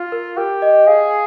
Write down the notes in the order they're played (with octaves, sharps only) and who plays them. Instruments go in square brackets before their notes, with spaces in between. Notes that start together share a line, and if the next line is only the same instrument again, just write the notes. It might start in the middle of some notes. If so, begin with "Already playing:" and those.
Already playing: [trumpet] F4
[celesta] A#4
[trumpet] G4 [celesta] A#4
[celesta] D#5
[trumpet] G#4 [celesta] F5